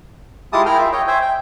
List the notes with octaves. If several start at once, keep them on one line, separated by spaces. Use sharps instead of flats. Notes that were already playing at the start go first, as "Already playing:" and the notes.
G#3 E4 F4 G4 A5 D#6
E4 G#4 A#4 G5 F6
F4 E5
C#5 D#5 G5
C5 E5 G5 G#5
G5